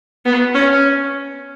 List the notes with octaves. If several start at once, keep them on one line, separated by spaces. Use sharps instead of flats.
B3
C#4